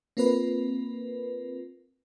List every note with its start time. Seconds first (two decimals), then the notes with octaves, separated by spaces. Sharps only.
0.17 A#3 C4 F4 A#4 B4